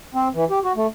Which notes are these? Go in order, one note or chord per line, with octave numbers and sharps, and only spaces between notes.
C4
E3
G4
F#4
A3